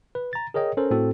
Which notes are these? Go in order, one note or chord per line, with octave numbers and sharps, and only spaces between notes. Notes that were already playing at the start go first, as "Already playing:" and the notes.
B4
A#5 A6
G#4 A#4 C#5 D#5 G5
C#4 A4 A#4 C5
A2 C4 F#4 A4